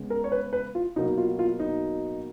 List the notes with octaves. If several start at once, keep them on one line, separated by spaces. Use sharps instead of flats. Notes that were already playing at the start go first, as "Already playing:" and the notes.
Already playing: C#3 G#3 B3
A#4
C#5
B4
B4
F4
B2 F#3 A#3 D#4
F4
F4
D#4